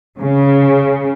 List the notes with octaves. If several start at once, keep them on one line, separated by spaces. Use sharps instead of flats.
C#3